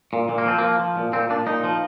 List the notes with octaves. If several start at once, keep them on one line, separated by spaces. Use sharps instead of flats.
A#2
A#2
A#3
F3 C4
F3 A#3
F3
A#2
A#2 C4
A#2 D4
A#2 D#4
F3